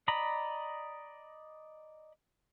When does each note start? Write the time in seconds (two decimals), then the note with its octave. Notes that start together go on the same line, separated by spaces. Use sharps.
0.08 D5 D#5 A#5 B5